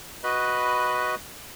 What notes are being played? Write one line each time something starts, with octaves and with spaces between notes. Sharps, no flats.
F#4 B4 D#5 B5 F#6